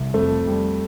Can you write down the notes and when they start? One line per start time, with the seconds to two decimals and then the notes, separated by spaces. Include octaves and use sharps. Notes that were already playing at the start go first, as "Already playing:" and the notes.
Already playing: C2
0.14 F2 A3
0.47 G3